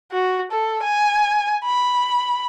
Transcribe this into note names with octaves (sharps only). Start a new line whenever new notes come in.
F#4
A4
G#5
B5